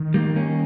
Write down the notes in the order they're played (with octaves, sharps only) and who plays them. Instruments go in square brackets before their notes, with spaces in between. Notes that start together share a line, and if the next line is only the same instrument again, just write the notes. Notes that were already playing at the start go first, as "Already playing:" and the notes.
Already playing: [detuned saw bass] D#3
[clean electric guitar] G3 A#3
A#3 C#4